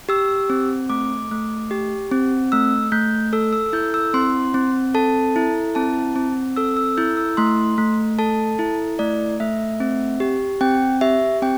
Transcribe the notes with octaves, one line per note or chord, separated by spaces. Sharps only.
G4 E6
C4
A3 D6
A3
G4
C4
A3 E6
A3 G6
A4 E6
E6
E4 G6
E6
C4 C6
C4
A4 A5
E4
C4 A5
C4
A4 E6
E6
E4 G6
E6
A3 C6
A3
A4 A5
E4
A3 D5
A3 E5
C4
G4
C4 G5
G4 E5
C4 G5